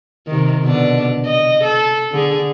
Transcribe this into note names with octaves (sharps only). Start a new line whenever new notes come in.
C3 D#3
B2 D3 D4
D#5
A4
D3 G#4